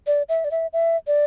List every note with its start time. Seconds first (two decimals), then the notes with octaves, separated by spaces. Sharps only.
0.07 D5
0.29 E5
0.44 D5
0.51 E5
0.73 E5
1.07 D5